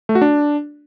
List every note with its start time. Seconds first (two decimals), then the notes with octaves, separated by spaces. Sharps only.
0.09 A3
0.15 F#4
0.22 D4